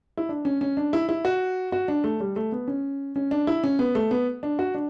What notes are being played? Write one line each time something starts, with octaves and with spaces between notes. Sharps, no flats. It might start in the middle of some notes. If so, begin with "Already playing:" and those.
E4
D4
C#4
C#4
D4
E4
E4
F#4
F#4
D4
A3
G3
A3
B3
C#4
C#4
D4
E4
C#4
B3
A3
B3
D4
F#4
D4